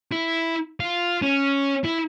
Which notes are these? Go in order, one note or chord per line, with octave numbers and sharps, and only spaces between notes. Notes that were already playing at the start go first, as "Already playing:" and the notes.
E4
F4
C#4
E4